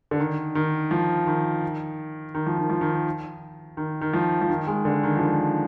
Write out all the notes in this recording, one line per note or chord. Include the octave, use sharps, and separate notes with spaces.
D3
D#3
D#3
F3
D#3
D#3
F3
D#3
F3
D#3
D#3
D#3
F3
F3
D#3
G#3
D3
D#3
F3
D#3